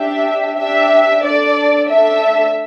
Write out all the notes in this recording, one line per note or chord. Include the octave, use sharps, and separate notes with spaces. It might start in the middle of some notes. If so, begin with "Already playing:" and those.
Already playing: D4 G4 E5
D4 G4 E5
D4 A4 D5
A3 D4 A4 E5